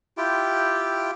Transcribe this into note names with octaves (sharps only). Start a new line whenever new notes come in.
E4 F4 G4 G5